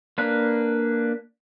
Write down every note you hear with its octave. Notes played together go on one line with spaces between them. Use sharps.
A#3 D4 B4